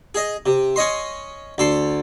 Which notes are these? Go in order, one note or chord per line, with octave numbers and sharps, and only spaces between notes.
G#4 D#5
C3
C#4 C#5 D#5 C6
D2 A4 C6